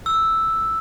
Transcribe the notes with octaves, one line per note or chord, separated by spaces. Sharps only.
E6